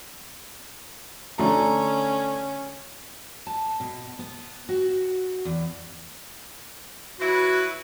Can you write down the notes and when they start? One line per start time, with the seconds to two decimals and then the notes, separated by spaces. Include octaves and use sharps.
1.38 D3 A3 C#4 A#5
3.47 A5
3.80 B2
4.19 B3
4.69 F#4
5.45 E2
7.19 F#3 E4 F#4 B4